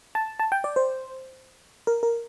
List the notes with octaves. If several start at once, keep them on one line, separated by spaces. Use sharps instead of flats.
A5
A5
G5
D5
C5
A#4
A#4